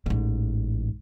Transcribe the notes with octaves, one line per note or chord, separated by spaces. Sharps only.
A1 G#2